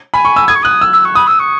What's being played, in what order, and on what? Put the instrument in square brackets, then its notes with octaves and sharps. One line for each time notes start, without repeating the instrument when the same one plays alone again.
[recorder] G#5 [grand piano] B5
[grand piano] C#6
E6
[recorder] D#6 [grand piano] G#6
[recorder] C#6
[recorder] D#6 [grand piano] F#6
[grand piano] E6
[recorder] E6
C#6
[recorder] B5 [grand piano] D#6
[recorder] E6
C#6